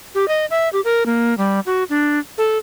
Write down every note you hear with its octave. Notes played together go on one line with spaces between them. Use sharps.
G4
D#5
E5
G4
A#4
A#3
G3
F#4
D4
A4